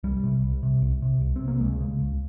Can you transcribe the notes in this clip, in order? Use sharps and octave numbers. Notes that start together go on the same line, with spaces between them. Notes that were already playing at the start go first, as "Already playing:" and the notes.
C2 G3
C3
C2
C3
C2
C3
C2
C3 C4
A#3
C#2 G#3
C#3
C#2